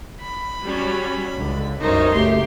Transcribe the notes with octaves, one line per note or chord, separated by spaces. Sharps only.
B5
F#3 G3 C#4
C#2 D3
C2 F#2 G3 D#4 A#4 C5 C#5
F#1 A3 G4 C6